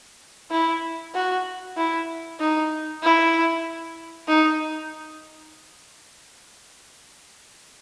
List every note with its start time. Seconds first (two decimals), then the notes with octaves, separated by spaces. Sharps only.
0.51 E4
1.14 F#4
1.77 E4
2.40 D#4
3.02 E4
4.28 D#4